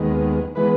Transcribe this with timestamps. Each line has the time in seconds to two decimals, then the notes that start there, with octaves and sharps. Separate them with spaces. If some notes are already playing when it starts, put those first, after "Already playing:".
Already playing: D#2 D#3 G#3 B3
0.55 E3 G#3 B3 B4